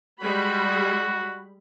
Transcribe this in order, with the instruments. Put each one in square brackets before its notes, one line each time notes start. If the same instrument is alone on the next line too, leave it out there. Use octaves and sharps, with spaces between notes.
[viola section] G3 G#3 B5 [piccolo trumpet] F#4